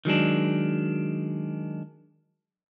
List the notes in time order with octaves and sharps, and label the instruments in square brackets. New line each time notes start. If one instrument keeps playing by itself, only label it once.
[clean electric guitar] D#3 F#3 G#3 D4